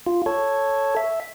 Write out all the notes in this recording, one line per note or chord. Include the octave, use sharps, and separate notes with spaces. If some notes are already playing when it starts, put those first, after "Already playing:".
F4
A4 C#5
E5